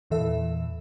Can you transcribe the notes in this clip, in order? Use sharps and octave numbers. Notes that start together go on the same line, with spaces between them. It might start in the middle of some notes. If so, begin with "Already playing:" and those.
E2 A#2 E3 A4 E5